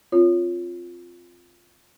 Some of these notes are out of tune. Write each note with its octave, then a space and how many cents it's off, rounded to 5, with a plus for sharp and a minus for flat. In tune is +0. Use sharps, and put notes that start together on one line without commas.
C4 +0 F4 +0 C#5 +0